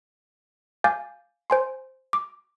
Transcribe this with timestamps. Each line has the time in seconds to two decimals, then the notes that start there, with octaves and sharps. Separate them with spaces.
0.84 F5 G#5 D6 G6 A6
1.50 C5 G#5 C6
2.13 D6